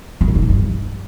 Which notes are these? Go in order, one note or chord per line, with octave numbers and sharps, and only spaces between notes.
G2
A#2
D#3
A2
G2